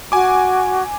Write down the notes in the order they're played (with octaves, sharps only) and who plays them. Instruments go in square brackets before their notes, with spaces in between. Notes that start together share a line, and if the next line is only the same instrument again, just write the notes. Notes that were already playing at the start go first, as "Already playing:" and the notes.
[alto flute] F#4 [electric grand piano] G#5 D6